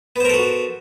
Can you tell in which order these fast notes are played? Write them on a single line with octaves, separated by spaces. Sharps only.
B3 C5 A#4 A4 F#4